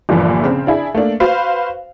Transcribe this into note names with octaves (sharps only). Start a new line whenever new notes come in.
G1 G2 A#2 D3 E3 F3
C#3 C4
D4 E4 G#4
A3 A#3 D4
F#4 B4 C5 F5